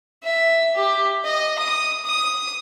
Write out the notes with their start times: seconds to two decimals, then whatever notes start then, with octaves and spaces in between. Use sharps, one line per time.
0.24 E5
0.76 G4
1.25 D#5
1.58 D#6
2.05 D#6